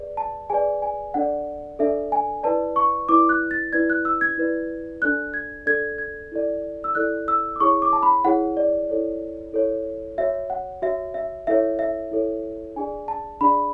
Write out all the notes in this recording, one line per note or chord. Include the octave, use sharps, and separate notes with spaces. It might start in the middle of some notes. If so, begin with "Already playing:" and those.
Already playing: G#4 B4 D5
A5
G#4 B4 D5 G#5
G#5
D4 A4 D5 F#5
D4 A4 D5 E5
G#5
E4 B4 D5 A5
C#6
E4 B4 D5 D6
F#6
A6
E4 B4 D5 G#6
F#6
E6
G#6
E4 B4 D5
D4 A4 D5 F#6
G#6
D4 A4 D5 G#6
G#6
E4 A4 D5
E6
E4 A4 D5 F#6
E6
D6
E4 G#4 C#5 C#6
D6
A5
B5
E4 G#4 C#5 F#5
D5
E4 A4 C#5
E4 A4 C#5
F#4 C#5 E5
F#5
F#4 C#5 E5
E5
E4 A4 C#5 E5
E5
E4 A4 C#5
D4 G#4 D5 G#5
A5
D4 G#4 D5 B5